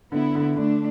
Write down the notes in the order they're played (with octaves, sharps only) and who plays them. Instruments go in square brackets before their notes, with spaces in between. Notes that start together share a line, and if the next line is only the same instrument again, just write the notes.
[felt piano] D3 [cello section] B3 E4
[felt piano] D3
[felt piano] D3 [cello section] A3 D4